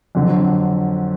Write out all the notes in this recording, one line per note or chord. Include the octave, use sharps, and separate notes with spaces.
F2 D3 F#3